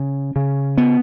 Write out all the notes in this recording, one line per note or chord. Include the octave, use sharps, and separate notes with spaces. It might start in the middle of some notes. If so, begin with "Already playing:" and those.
Already playing: C#3
C#3
B3